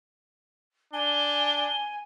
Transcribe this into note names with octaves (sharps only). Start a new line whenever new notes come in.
D4 G#5 G7